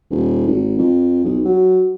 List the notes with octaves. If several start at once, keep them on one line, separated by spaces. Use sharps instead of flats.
D#1
G#1
F2
B1
F#3